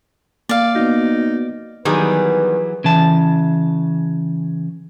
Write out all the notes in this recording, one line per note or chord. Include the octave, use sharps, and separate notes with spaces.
A#3 D5 F5
B3 D#4 F#4
D#3 E3 F#3 G3 B3 G#4 B4
C#3 E3 A5